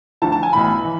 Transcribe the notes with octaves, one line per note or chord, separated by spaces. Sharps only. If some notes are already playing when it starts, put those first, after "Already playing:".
D2 D3 F3 A5
A5
G#5
B1 A2 E3 B5
E3